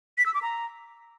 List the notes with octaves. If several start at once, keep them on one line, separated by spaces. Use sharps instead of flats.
B6
E6
D6
A#5